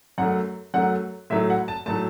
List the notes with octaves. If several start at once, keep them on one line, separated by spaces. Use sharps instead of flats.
F#2 F#3 A3 F#5
F#2 F#3 A3 F#5
A2 F#3 A3 E5
F#5
A5
A2 F#3 A3 A5